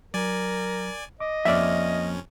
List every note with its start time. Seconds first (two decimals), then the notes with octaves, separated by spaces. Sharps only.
0.14 F#3 A#4 D5 G#5
1.20 D#5 D6
1.45 F2 F3 A#3 C#4 D5 E5 F6